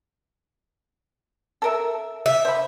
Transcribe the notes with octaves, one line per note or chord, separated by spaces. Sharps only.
A4 A#4 E5
E5
C5 B5